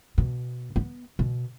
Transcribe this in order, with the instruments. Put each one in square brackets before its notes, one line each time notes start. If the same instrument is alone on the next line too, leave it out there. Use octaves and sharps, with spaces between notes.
[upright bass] B2
B3
B2